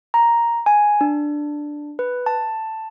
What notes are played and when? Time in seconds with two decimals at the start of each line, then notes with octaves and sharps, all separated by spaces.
0.14 A#5
0.66 G#5
1.01 D4
1.99 B4
2.26 A5